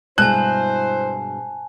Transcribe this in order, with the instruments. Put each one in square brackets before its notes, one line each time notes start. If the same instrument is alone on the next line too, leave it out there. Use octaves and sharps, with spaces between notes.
[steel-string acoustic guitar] G2 B2 G#3 [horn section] E4 C5 [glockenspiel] G#5 A5 [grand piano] F#6